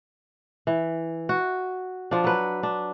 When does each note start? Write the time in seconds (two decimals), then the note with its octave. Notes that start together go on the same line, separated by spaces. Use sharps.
0.67 E3
1.29 F#4
2.11 F3 D4
2.24 F#3 B4
2.63 D4